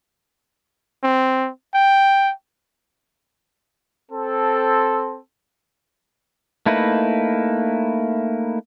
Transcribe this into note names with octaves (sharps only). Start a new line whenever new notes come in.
C4
G5
C4 A4
A3 A#3 D#4 E4 B4